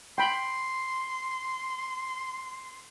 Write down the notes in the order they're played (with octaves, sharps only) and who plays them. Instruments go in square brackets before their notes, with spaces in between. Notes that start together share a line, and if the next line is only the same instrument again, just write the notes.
[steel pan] G5 B5 [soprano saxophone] C6